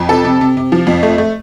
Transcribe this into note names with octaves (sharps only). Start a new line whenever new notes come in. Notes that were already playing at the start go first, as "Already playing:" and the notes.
Already playing: F2
C3 A4
C3
C3
C3
F3
F2
A3
A3